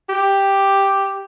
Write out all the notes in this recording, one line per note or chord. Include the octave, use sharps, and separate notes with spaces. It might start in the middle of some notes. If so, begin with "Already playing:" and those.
G4